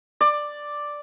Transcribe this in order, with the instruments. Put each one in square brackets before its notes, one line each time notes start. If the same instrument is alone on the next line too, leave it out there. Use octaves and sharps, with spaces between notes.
[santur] D5